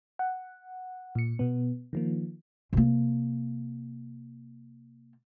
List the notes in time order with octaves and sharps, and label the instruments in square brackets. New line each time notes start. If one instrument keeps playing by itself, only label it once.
[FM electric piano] F#5
A#2 C#7
B2 B3
D#3 F3 A#3
[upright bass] C3 A#3